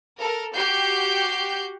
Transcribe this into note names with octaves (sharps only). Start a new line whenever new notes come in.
A4 A#4
F#4 G4 G6 C7